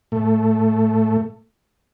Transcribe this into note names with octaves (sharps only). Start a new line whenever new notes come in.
A2 A3